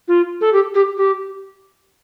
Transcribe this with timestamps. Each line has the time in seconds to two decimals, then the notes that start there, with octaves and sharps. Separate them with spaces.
0.08 F4
0.41 A4
0.53 G4
0.75 G4
0.98 G4